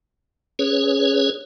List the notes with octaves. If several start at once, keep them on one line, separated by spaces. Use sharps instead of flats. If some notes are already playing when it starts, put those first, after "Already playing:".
C#4 G#4 B4 C#5